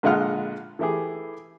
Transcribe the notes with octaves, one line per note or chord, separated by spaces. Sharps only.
A#1 D3 G#3 F4 F#5 F6
E3 A3 E4 G4 G#4